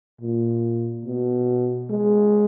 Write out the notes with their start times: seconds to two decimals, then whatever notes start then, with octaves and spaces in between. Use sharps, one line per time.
0.21 A#2
1.06 B2
1.90 G#3